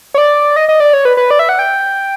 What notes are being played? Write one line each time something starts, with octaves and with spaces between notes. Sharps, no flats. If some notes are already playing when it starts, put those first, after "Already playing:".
C#5
D5
D#5
D#5
D5
C#5
B4
B4
D5
E5
F#5
G5